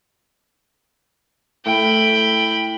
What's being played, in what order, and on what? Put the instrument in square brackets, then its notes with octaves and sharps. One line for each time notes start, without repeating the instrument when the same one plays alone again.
[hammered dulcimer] A2 [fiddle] G5 B5